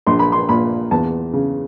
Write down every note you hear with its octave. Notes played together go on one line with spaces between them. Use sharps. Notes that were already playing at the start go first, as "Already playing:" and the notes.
A#1 C6
B5
C6
A#2 B5
E2 A5
C#3